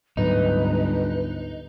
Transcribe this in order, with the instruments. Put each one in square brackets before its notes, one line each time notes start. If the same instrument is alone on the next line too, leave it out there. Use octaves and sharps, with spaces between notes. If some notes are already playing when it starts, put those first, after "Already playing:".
[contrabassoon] G1 [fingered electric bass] D2 G#2 F#3 [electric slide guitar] D#4 [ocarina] B4